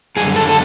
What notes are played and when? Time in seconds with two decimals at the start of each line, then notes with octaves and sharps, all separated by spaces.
0.16 F#2 D3 G3 G#4
0.36 A4
0.49 A4